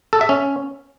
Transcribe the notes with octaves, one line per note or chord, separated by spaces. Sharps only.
A4
E5
C#4